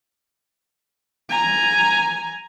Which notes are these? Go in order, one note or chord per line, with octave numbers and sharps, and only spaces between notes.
G#5 A#5